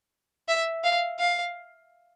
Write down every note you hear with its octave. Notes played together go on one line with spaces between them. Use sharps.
E5
F5
F5